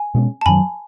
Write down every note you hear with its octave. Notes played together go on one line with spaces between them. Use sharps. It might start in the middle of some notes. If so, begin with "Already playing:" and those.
Already playing: G#5
B2 G#3 C#4
A5
F#2 D#3 F#3 G#5 B5